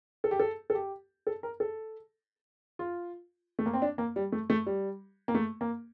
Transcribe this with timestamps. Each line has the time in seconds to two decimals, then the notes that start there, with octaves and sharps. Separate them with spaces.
0.24 A4
0.31 G4
0.40 A4
0.70 A4
0.75 G4
1.27 A4
1.43 A#4
1.60 A4
2.79 F4
3.59 A3
3.66 A#3
3.73 C4
3.82 D4
3.98 A#3
4.16 G3
4.32 A3
4.50 A3
4.66 G3
5.28 A#3
5.35 A3
5.61 A#3